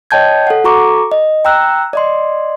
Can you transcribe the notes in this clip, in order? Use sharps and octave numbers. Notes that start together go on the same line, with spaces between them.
C#5 D#5 G5 A5 G6 G#6
A4 F#5
F#4 A4 A#5 C#6 D6
D#5
G5 A#5 E6 F#6
D5 D#5 C6